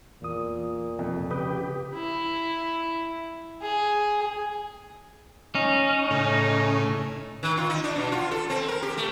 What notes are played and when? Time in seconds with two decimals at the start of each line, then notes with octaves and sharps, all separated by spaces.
0.22 E2 A#2 D#6
0.99 F2 C3
1.31 C#3 G4 B4 D#6
1.95 E4
3.62 G#4
5.55 C#4 D#4
6.11 A2 C#3
7.43 D#3
7.57 F4
7.70 D#4
7.84 D4
7.96 B2
8.12 F4
8.31 A4
8.50 C4
8.68 A#4
8.82 G4
8.97 A3